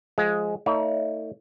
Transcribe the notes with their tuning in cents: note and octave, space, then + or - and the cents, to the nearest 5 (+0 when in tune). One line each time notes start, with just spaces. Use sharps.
F3 +0 G#3 +10
A3 +35 D#4 +45 C#5 +40